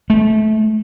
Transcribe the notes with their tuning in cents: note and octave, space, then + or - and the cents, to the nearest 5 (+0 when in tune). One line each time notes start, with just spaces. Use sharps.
A3 -25